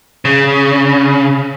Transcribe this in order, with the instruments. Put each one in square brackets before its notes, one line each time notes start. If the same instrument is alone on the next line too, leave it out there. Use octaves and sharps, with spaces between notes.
[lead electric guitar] C#3